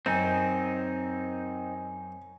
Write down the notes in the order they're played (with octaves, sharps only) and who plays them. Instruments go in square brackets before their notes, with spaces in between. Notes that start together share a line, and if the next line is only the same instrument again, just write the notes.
[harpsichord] F#2 [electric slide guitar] C4 D#4 [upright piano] G#5